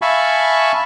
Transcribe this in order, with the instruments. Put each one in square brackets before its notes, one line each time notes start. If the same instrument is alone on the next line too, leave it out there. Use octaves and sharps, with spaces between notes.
[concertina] E5 F5 G#5 A5 B5 C#6